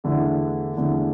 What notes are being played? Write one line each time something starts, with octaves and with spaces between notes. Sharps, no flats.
E2 D3 A3 E4
E2 D3 A3 E4